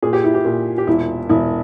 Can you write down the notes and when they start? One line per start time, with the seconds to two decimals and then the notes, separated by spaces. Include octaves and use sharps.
0.02 A#2 G#4
0.13 G4
0.24 E4
0.34 G4
0.45 A#2
0.78 G4
0.87 E1 E4
1.29 E1 E4